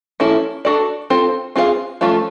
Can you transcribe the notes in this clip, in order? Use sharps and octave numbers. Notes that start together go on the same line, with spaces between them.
F3 A#3 C#4 E4 A4
D4 F#4 A4 D5
C4 F4 A4 C5
C4 F4 G#4 C#5 F5
F3 A3 C#4 F4 A4